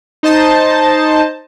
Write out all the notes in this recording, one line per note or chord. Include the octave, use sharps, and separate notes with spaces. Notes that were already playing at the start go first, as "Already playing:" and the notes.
D#4 C5 D#5 A5